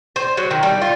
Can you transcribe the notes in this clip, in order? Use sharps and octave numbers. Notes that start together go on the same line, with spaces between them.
C5
F#3
D#3
G3
F4